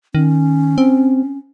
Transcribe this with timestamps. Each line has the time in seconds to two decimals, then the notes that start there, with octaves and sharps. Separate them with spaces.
0.15 D#3 C#4
0.78 C4